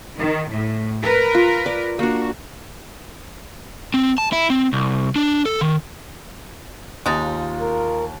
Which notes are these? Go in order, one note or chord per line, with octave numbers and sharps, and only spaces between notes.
D#3
A2
A#4 B4
F4
D5
A#3 D4 F#4
C4
A5
E4
C4
C2
D4
A4
D#3
D#2 G#3 D#4 F4 A6
A#4